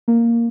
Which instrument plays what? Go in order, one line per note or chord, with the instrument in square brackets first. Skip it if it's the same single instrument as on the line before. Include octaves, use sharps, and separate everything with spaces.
[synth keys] A#3